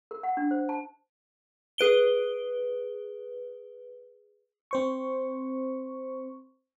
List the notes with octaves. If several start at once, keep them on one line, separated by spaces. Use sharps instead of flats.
A#4
F#5
D4
C5
A5
G#4 B4 D7 G7
C4 C5 C#6